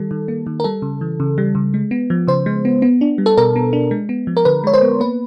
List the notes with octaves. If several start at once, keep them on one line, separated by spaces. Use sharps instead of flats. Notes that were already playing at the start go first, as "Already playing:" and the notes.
Already playing: D#3 G3 A4
D#3
A#3
D#3
A#4
G3 A4
C#3
E3
C#3
G3
C#3
G#3
B3
F3
C#3 C5
G#3
B3
B3
D4
G3
A4
B2 A#4
B3
D4
G#3
B3
F3
A#4
D3 B4
G#3 C#5
C5
B3
A#3 B4